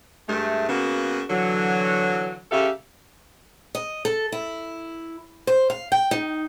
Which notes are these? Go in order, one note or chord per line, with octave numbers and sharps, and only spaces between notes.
G2 G#3 A3
C#3 A#3 B3 F#4
D3 E3 F#3
C#3 G4 A4 E5 F5
D#5
A4
E4
C5
F5
G5
D#4